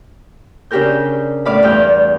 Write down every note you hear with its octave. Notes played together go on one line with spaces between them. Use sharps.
C#3 D4 G4 G#4 A#4 G6
A2 D5 F5 B5
E2 G2 G5 F6 G6